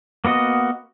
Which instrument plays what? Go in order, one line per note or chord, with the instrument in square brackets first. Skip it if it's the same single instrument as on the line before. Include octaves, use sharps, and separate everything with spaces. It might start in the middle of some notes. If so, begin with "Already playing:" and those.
[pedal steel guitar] A#3 B3 F#4 D#5